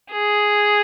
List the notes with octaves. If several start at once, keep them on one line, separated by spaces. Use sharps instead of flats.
G#4